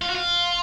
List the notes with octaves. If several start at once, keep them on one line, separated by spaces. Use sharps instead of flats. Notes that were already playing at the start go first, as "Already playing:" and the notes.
F4
F#4
F4